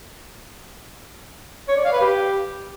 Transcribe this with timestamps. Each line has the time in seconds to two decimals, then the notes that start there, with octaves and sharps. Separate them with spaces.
1.68 C#5
1.77 D5
1.85 F5
1.93 B4
2.01 G4